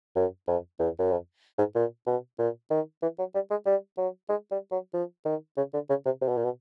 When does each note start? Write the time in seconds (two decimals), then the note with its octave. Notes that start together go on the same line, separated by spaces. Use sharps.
0.15 F#2
0.47 F2
0.79 E2
0.99 F#2
1.11 F2
1.58 G#2
1.75 A#2
2.06 B2
2.39 A#2
2.70 D#3
3.02 E3
3.18 F#3
3.34 G3
3.50 G#3
3.66 G3
3.97 F#3
4.29 G#3
4.51 G3
4.71 F#3
4.93 F3
5.25 D#3
5.57 C#3
5.73 D3
5.89 C#3
6.05 C3
6.21 C3
6.28 B2
6.37 A#2
6.44 B2